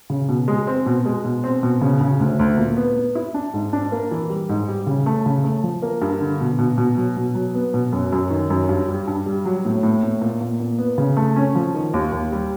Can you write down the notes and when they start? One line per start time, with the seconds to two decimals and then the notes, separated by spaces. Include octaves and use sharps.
0.10 C#3
0.28 B2
0.48 G#3
0.67 C4
0.86 B2
1.06 G#3
1.25 B2
1.44 C4
1.63 B2
1.82 C#3
2.01 C#3
2.20 D2
2.39 D2
2.58 A#2
2.77 B3
2.96 B3
3.15 E4
3.34 D4
3.54 G#2
3.73 D4
3.92 A#3
4.11 E3
4.30 G3
4.49 G#2
4.68 G3
4.87 C#3
5.06 A3
5.26 C#3
5.44 A3
5.64 F3
5.82 A#3
6.01 G2
6.20 D3
6.40 B2
6.59 B2
6.78 B2
6.97 F#3
7.17 B2
7.35 F#3
7.55 B3
7.74 B2
7.92 F#2
8.12 F#2
8.30 D#3
8.50 F#2
8.69 G2
8.88 G3
9.07 G2
9.26 G3
9.45 F#3
9.65 A2
9.83 A2
10.03 A2
10.22 A#2
10.41 A#2
10.60 A#2
10.78 B3
10.98 C#3
11.17 A3
11.36 C#4
11.55 F3
11.74 D#3
11.94 D#2
12.12 D#2
12.32 G3